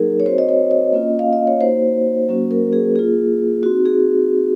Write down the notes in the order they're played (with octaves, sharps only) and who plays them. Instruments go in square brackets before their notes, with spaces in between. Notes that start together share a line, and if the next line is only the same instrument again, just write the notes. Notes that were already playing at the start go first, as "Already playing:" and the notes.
Already playing: [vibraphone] F#3 A#3 D#4 G#4 A#4
C#5
C4 F#4 C5
D#5
C#5
D#5
A#3 C#4 F4
F5
D#5
C#5
A#3 D#4 F#4 C5
F#3 A#3 C#4 F#4
A#4
G#4
A#3 F4 G#4
C4 D#4 F#4
G#4